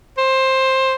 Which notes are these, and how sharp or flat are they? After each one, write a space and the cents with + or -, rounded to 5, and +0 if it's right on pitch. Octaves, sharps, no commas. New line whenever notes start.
C5 +15